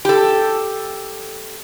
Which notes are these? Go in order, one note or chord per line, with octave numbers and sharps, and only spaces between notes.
G4 A4